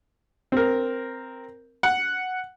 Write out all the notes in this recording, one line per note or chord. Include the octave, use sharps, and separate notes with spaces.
C4 A#4
F#5